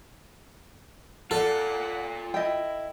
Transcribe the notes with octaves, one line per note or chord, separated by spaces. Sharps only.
F4 A4 D5 F#5
E4 D#5 G5